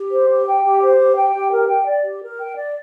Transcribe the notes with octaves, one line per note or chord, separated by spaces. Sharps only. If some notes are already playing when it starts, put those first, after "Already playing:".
Already playing: G4
C5
G4
G5
G4
C5
G4
G5
G4
A#4
G5
D5
G4
A#4
G5
D5